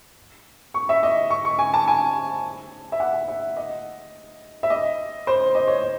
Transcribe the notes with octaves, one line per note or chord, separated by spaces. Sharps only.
C#6
E5
D#5
C#6
C#6
G#5
A5
G#5
E5
F#5
E5
D#5
E5
D#5
C5
D#5
C#5
D#5